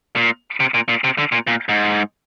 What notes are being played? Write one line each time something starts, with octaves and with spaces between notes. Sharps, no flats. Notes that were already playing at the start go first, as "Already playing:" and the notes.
A#2
C3
A#2
A#2
C3
D3
A#2
A#2
G#2